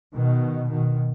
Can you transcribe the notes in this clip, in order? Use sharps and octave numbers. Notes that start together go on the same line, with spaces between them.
B2 D#3
B2 D#3